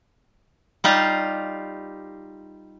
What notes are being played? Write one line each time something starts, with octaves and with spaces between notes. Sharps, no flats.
G3 D#4 F4 G4